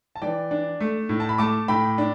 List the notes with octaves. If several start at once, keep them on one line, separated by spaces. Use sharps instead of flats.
A5
E3 D5 G5
D4
A3
A2
A5
B5
A3 A5 D6
A2 G5 B5
D4